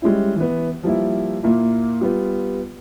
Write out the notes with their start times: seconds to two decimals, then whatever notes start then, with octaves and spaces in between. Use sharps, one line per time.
0.02 G3 G#3 C#4 E4
0.36 E3 B3
0.83 F3 G3 A#3 E4
1.43 A#2 A#3 E4
2.01 G3 B3 F4